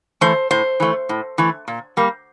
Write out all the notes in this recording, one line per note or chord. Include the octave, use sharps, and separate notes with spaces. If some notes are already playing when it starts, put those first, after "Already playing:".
E3 A3 C5
A2 C5
E3 A3
A2
E3 A3
A#2
G3 A#3